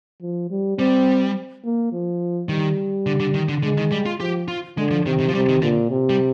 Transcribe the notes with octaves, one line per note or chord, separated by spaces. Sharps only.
F3
G3
G3 C4
A#3
F3
D#3 G3
D3
D3
D#3
D3
D3 G#3
D#3
G3
F4
F3 G4
F4
D3 G#3
F3
C3 D#3
D#3
F3
C3 G3
D#3
A#2 D3
C3
G3